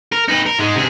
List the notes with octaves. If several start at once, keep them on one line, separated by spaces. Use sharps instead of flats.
A#4
D#4 B4
A#4
G#2 G#3
C3 G#4